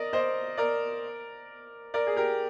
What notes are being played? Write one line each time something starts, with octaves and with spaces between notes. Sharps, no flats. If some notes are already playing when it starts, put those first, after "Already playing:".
Already playing: A#4 D5 D#5
C5 D#5
A#4 D5
A#4 D5
G#4
G4 A#4